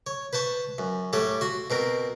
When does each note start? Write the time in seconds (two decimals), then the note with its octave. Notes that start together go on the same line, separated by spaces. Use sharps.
0.07 C#5
0.33 B4 C5 A5 C#6
0.78 F#2
1.13 A2 G3 A4 C#5 F#5
1.41 F#4 C6
1.70 B2 C4 A#4